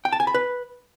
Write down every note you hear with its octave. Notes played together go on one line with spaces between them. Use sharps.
G5
A5
G#5
B5
B4